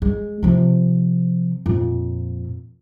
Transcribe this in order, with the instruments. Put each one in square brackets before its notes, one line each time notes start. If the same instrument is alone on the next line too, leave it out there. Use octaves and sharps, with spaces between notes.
[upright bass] G#3
C3 F3
F2 A#2